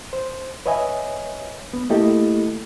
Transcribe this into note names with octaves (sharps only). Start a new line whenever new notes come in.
C5
B4 C#5 D#5 E5 G#5
B3
A3 A#3 E4 G4 A4 D#5